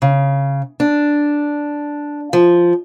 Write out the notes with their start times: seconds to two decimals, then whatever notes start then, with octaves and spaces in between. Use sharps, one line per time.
0.02 C#3
0.80 D4
2.33 F3